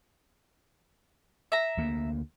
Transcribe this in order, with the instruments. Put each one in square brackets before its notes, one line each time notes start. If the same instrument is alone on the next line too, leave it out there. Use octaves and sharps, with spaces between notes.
[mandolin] E5 A#5
[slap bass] D2 A#3